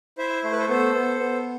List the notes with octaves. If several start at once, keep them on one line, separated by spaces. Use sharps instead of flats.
E4 C5 E5
A3 C5
B4
A4 C5
B3 A4 C5
B3
B3